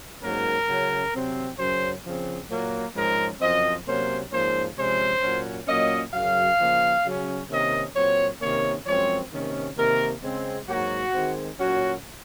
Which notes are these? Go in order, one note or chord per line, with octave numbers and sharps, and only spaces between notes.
G#2 F#3 A#3 C#4 A#4
C#3 F#3 C#4
C3 F#3 C4
F#2 C#3 F#3 C#4 C5
C#3 F3 C4
A#2 F#3 A#3
G#2 F3 G#3 C#4 A#4
F#2 F3 C4 D#5
C3 F#3 A#3 C#4 C5
G#2 F3 A#3 C#4 C5
C3 F3 G#3 C#4 C5
A#2 F#3 C#4
A#2 F#3 A#3 C#4 D#5
F#2 C#3 F#3 F5
C#3 F3 A#3
C#3 F#3 C#4
C3 D#3 A#3 C#4 D#5
A#2 F#3 C4 C#5
C3 D#3 A#3 C#4 C#5
F#2 F3 G#3 C4 C#5
C3 D#3 A#3 C#4
C3 D#3 A#3 A#4
C#3 G#3 C4
G#2 F#3 A#3 F#4
D#3 G#3 C4
A#2 F#3 C#4 F#4